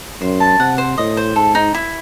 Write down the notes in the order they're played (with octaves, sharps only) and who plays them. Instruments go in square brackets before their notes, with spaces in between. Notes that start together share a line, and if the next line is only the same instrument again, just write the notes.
[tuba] F#2 [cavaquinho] C5
[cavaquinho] A5
[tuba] C3 [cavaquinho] F#5
[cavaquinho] C5
[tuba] A2 [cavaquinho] D#5
[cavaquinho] C5
[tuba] G#2 [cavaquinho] A4
[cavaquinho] D#4
E4